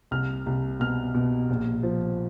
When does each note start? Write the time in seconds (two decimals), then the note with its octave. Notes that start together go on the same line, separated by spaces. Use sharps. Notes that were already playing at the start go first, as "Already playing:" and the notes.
0.11 C2 F6
0.46 C2
0.80 B2 F6
1.14 B2
1.49 A#1
1.83 F3